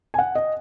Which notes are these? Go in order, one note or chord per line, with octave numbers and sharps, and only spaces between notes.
G#5
F#5
D#5